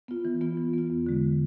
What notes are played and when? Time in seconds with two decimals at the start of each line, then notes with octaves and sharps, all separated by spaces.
0.08 B3 F4
0.25 E3
0.41 B3 F4
0.58 E3
0.74 B3 F4
0.90 E2
1.07 D3 G#3